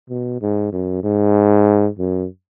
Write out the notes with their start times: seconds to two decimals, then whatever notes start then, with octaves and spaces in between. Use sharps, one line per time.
0.09 B2
0.41 G#2
0.72 F#2
1.03 G#2
1.99 F#2